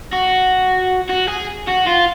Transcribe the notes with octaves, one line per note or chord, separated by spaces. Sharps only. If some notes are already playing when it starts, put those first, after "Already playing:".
F#4
F#4
G#4
F#4
F4